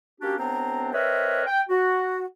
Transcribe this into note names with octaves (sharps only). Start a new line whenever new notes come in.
A#3 C#4 D4 F#4 G4
C#2 B3 C4 D4 C5 A#5
C4 A#4 B4 C#5 D#5 E5
G5
F#4